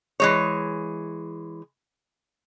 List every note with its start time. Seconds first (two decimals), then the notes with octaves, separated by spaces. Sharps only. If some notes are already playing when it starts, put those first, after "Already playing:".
0.20 E3 G#3 C#5